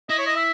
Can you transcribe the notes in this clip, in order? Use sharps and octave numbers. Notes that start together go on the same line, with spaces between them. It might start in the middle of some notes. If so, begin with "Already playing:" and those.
E4 D#5
C#5
D#5
E5